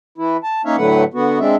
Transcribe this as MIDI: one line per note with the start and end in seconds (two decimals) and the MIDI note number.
0.18 0.37 52
0.18 0.37 64
0.44 0.62 81
0.65 0.76 58
0.65 0.76 61
0.65 0.76 63
0.65 0.76 73
0.65 0.76 76
0.65 0.76 77
0.77 1.04 45
0.77 1.04 50
0.77 1.04 54
0.77 1.04 57
0.77 1.04 71
0.77 1.04 78
1.14 1.39 50
1.14 1.39 59
1.14 1.39 66
1.40 1.56 56
1.40 1.56 60
1.40 1.56 62
1.40 1.56 76